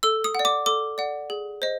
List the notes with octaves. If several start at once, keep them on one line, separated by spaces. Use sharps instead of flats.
A4 E6
D#6
D5 F#5
D6
A4 D6
D5 F#5
G#4
C5 D#5